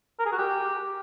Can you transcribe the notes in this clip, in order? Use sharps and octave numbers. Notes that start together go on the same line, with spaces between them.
A#4
G#4
F#4
G4